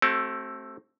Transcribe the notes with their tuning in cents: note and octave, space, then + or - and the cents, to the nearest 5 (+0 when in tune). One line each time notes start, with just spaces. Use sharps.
A3 +0 C4 +25 F#4 +45